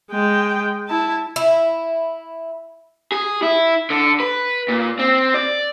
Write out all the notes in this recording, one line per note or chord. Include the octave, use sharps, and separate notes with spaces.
G#3 G5
E4 A5
E4
G#4
E4
D3
B4
A#2
C4
D5